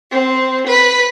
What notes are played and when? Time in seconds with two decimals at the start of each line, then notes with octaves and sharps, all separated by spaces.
0.10 C4
0.66 B4